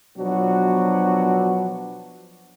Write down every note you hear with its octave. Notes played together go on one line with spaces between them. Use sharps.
B2 F3 F#3 B3 D4 F#4